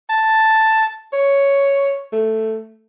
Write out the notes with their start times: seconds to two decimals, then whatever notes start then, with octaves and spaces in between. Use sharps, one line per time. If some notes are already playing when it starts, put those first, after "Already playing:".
0.10 A5
1.13 C#5
2.12 A3